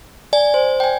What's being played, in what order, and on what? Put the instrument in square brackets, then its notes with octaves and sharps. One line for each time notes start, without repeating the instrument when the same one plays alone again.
[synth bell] D5 [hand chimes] G#5
[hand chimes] C5
G5 G#5